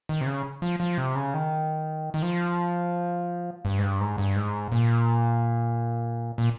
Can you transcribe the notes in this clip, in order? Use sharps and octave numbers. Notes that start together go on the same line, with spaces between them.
D#3
C3
C#3
F3
F3
C3
C#3
D#3
D#3
F3
G2
G#2
G2
G#2
G2
G#2
A#2
A#2